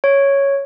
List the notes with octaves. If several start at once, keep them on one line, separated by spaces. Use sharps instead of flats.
C#5